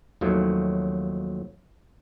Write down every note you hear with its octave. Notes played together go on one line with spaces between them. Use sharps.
D#2 D#3 F3 F#3 A3